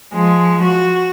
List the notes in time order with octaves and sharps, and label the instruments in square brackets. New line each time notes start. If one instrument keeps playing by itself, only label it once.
[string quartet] F3 G#3
F#4